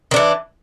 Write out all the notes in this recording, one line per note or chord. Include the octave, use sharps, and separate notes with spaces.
D#3 E3 D4